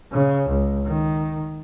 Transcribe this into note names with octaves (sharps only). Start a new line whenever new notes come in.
C#3
C#2
D#3